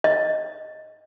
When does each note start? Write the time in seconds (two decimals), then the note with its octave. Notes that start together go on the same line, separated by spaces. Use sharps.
0.04 D#5